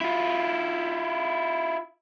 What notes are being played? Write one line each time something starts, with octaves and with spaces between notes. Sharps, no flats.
E4 F4